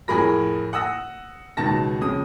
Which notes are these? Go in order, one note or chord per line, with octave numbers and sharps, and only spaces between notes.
F2 A2 G#4 A#4 B5 A#6
F#5 D#6 E6 A#6
C#2 B2 D#3 A5 A#6
F2 C#3 D#6